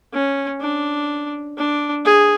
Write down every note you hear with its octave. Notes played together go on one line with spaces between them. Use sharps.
C#4
D4
D4
G#4